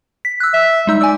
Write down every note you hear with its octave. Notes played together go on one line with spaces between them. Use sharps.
B6
E6 F#6
E5
G3 G#3 D#4 E6
D5 G#5 E6